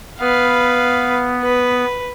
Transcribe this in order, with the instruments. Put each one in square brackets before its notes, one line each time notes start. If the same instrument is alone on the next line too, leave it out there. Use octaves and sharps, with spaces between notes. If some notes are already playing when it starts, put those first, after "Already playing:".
[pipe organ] B3 [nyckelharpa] B4 F5
[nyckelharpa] B4